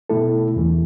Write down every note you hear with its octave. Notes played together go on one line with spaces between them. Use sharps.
B2 A3 E4 A4
E2 E3 A3